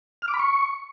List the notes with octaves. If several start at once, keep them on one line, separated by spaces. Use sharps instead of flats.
F6
D6
B5
C#6